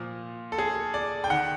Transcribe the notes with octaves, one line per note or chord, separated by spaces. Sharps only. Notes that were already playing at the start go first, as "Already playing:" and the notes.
Already playing: A#2 F3
A4
G#4
D5
G5
D#3 F#5